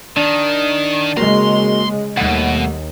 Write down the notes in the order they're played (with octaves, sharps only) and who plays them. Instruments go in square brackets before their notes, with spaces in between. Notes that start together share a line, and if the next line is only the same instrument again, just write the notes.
[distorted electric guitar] D#3 [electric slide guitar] D4
[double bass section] C#3 G#3 [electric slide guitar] A#3 F#4 A#4 [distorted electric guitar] C6
[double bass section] D#2 [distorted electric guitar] B2 [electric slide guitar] G3 A3 F#5